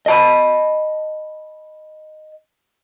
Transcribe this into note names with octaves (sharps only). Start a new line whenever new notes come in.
D#5 A5 B5